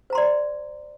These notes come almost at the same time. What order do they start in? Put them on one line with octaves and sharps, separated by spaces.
C5 A#5 C6 D5